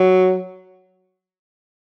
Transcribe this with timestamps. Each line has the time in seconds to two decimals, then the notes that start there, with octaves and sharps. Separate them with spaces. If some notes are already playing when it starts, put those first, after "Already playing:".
Already playing: F#3